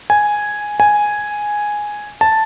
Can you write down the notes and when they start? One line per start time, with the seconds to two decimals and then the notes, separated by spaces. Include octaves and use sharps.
0.10 G#5
0.80 G#5
2.21 A5